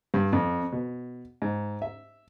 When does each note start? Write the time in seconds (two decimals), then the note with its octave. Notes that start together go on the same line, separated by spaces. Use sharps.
0.14 G2
0.33 F2
0.72 B2
1.42 G#2
1.82 E5